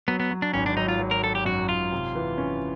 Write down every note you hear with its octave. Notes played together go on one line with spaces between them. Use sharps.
F#3 B3
B3
F#3
D4
G#1 C#4
D4
F#3 D#4
F4
F#3
A#4
F#3 A4
G4
F#2 F#4
G#1 F4
C3
E3
C#4